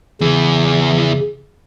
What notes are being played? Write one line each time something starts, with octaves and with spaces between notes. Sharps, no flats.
E2 C#3 E3